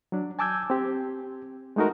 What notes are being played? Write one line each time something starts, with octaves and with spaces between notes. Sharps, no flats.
F#3 D4
G#5 A5 D6 E6 G6 G#6
C4 G4
G#3 A3 D#4 F#4 A#4